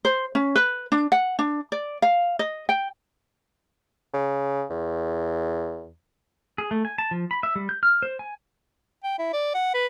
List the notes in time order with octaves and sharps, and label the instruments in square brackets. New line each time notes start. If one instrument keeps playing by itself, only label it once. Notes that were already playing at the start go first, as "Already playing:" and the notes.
[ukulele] C5
C#4
B4
D4
F#5
D4
D5
F5
D#5
G5
[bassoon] C#3
E2
[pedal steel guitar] G#4
A3
G#5
A5
F3
B5
E5
G3
G6
F6
C5
G#5
[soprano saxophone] G5
E4
D5
F#5
B4